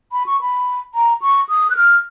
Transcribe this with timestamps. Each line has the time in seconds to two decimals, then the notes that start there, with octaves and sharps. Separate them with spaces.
0.12 B5
0.26 C#6
0.41 B5
0.94 A#5
1.22 C#6
1.49 D#6
1.70 F#6
1.77 F6